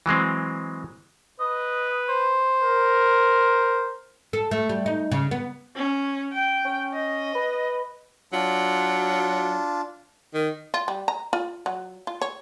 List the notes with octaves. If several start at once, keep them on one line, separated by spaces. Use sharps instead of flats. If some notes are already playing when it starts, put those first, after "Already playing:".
E3 F#3 G#3 C4
B4 D#5
C5
A#4
A4
A3
G3
D#4
C#3
B3
C#4
G5
C#4
D#5
B4
F#3 D4 F4
D#3
F4
G3
A#5
F4
F#3
F4
C#5